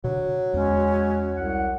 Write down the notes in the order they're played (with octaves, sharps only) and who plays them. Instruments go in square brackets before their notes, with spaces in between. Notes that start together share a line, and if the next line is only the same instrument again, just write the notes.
[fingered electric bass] B2 D3 [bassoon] F#3
[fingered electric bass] E2 [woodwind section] G#3 C#4
[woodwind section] C2 F#5